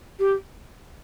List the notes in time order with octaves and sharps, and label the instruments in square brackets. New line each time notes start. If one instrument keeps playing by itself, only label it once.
[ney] G4